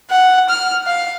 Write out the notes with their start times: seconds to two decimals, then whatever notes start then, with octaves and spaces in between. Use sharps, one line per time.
0.11 F#5
0.49 F6
0.87 F5